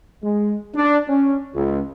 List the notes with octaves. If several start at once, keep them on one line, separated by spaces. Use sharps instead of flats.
G#3
D4
C#4
C#2